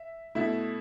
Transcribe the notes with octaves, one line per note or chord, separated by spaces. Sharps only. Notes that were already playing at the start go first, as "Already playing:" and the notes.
Already playing: E5
B2 A3 E4 E5